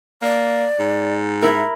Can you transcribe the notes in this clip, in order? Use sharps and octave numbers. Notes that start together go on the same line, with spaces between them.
A#3 D5
G#2
E4 A#4 E5